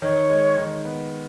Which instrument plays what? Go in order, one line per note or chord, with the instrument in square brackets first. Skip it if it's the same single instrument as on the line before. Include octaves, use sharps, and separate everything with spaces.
[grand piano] D#3 [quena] C#5
[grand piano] G#3
D#3
B3